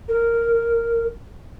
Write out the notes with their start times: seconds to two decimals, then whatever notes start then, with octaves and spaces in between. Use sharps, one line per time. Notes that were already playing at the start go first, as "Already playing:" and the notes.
0.08 A#4